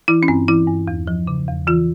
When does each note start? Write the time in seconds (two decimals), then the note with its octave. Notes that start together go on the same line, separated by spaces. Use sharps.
0.08 E3 E4
0.23 C#4
0.28 G2 C4
0.48 E3 E4
0.67 G2
0.88 E2
1.07 F3
1.27 C#3
1.48 E2
1.67 E3 F4